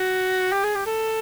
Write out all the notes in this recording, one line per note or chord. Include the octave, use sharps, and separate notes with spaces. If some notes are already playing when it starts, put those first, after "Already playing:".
Already playing: F#4
G4
G#4
G4
A4